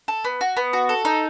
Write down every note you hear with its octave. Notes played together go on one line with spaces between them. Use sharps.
A4
B3
F#4
B3
F#4
A4
D#4